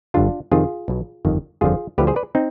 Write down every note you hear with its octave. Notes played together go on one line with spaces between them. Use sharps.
G1 G2 D3 D4 F4
F2 C3 D#3 F4 G#4
B1 B2
G1 F2 D#3
G1 F2 D3 F3 F4 G#4
D2 D3 F3 G4 B4
G#4 C5
B4 D5
C4 D#4